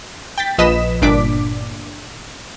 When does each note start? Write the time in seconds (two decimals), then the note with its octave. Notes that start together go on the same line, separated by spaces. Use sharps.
0.38 G5 A6 B6
0.58 A#1 F3 B4 D#5 B6 E7
1.02 G1 A#2 D4 D6 B6